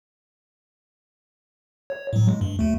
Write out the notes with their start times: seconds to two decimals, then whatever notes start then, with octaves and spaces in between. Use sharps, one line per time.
1.90 C#5
2.13 A2 F#3
2.29 G#3
2.41 G2
2.59 D#2 A3